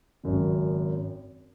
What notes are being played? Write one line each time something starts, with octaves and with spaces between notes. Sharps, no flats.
G#1 F#2 C#3